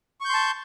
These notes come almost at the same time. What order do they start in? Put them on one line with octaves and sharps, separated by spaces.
C#6 G6 C6 A5